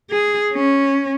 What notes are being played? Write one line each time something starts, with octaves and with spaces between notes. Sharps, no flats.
G#4
C#4